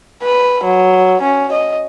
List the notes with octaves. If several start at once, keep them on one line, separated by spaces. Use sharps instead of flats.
B4
F#3
C#4
D#5